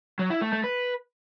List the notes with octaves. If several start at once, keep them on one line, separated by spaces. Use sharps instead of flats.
F#3
E4
A3
A3
B4